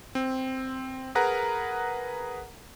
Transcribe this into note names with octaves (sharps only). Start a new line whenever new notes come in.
C4
G#4 A#4 B4 F#5 A#5